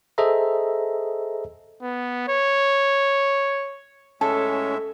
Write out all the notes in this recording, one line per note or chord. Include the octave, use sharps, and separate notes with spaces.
G#4 A4 C5 D#5 E5 A#5
B3
C#5
A2 G#3 C#4 A4 E5 A5